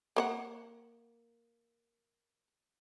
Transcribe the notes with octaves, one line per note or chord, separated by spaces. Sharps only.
A#3 C5 F#5